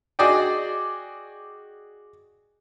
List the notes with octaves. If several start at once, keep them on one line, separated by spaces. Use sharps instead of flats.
F#4 G#4 D5 D#5 G5